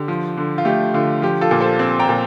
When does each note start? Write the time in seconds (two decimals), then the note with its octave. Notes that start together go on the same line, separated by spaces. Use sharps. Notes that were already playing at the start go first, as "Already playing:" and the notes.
Already playing: D3 G4
0.08 F3
0.37 D3
0.58 F4
0.65 A3 G4
0.94 D3 F4
1.22 F3 G4
1.41 F4 A4
1.51 A#2
1.60 A4 C5
1.79 C4
1.99 G5 A#5
2.09 A#2